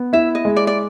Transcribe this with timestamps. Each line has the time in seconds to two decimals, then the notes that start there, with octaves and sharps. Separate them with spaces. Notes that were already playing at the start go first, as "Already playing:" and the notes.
Already playing: B3
0.13 E4 E5
0.35 D#5
0.45 G#3
0.56 D5
0.67 D5